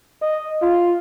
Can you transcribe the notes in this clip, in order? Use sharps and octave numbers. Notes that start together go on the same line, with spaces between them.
D#5
F4